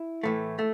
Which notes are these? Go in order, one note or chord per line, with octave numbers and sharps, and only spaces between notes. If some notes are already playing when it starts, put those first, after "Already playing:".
Already playing: E4
A2 E3 A3
A3